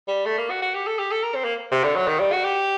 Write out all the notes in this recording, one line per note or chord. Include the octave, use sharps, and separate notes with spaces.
G3
A3
A#3
F#4
F#4
G4
A4
G4
A4
A#4
C4
A#3
C3
D3
F#3
D#3
G3
F#4
G4